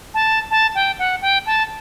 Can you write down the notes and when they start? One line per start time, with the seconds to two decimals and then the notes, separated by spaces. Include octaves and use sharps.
0.14 A5
0.51 A5
0.75 G5
0.99 F#5
1.22 G5
1.46 A5